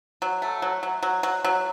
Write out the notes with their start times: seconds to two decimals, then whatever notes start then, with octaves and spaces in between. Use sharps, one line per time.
0.22 F#3
0.42 A3
0.62 F#3
0.83 F#3
1.03 F#3
1.23 F#3
1.45 F#3